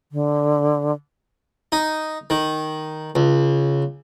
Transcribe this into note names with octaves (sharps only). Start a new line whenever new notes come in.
D3
D#4
D#3
C#2